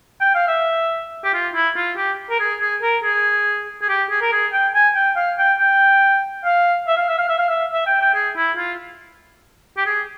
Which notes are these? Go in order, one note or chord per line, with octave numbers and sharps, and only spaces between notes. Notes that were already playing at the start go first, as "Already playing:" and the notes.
G5
F5
E5
G4
F4
E4
F4
G4
A#4
G#4
G#4
A#4
G#4
G#4
G4
G#4
A#4
G#4
G5
G#5
G5
F5
G5
G5
F5
E5
F5
E5
F5
E5
F5
E5
E5
G5
G5
G#4
E4
F4
G4
G#4